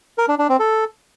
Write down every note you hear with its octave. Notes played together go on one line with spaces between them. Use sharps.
A#4
D4
D4
C4
A4